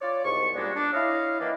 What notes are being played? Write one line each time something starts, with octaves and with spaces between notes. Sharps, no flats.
F4 C#5 D5
C2 G#2 C#6
A#2 G3 G#3 B3 D4
D4
E4 C#5 D#5 F5
D#3 E3 A#3 D4